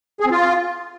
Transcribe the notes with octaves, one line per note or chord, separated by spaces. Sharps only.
G#4
C4
F4